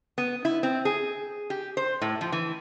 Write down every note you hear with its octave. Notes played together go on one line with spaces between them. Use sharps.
B3
E4
C4
G#4
G4
C5
A2
F3
E3